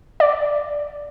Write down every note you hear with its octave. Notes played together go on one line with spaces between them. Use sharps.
D5